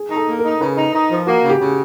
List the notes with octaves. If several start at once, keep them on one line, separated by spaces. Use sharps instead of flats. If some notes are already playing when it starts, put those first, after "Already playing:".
Already playing: G#4
D#4
A4
A#3
A#4
D#4
C#3 B4
D#4
D#4
F3
A#3 F#4
C#3
G4
C#3